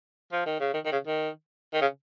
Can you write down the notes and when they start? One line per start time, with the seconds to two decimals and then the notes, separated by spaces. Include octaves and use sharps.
0.32 F3
0.46 D#3
0.60 C#3
0.74 D#3
0.85 D#3
0.92 C#3
1.07 D#3
1.74 D#3
1.81 C#3